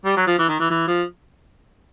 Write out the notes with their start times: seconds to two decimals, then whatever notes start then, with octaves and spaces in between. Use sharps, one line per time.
0.05 G3
0.16 F#3
0.27 F3
0.39 E3
0.48 D#3
0.60 E3
0.70 E3
0.87 F3